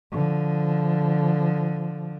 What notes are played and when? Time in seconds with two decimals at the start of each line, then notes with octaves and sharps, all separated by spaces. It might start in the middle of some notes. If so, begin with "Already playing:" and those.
0.12 D3 F3